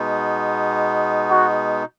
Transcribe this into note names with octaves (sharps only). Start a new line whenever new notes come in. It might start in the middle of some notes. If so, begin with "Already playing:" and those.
Already playing: B2 G#3 B3 D#4
F#4